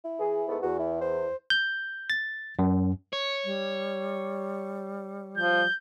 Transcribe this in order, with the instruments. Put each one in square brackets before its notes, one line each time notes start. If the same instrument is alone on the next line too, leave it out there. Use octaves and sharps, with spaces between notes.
[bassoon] E4
[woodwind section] E3 G#4
G#2 A3 B3
[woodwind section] E2 [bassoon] F#4
[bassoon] E4
C5
[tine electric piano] G6
A6
F#2
[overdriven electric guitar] C#5
[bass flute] G3
[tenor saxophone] F3 [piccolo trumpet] G6